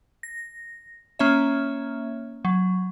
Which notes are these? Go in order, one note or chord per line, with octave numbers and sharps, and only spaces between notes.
A#6
A#3 C#4 C#5 E5
F#3